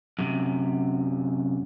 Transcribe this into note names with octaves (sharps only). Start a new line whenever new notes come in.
F#2 C3